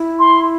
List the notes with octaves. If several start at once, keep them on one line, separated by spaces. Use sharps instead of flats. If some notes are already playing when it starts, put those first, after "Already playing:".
Already playing: E4
C6